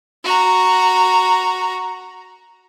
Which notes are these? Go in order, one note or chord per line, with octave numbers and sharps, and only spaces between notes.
F#4 A#5